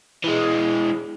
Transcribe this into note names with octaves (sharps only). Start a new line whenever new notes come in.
E3 G#3